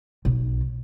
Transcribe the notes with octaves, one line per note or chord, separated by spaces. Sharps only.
B1